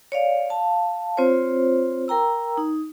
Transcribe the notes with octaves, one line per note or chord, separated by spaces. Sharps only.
C#5 D5 F5
F5 A5
C4 F4 C5 C#5
A#4 G5 A#5 E6
D#4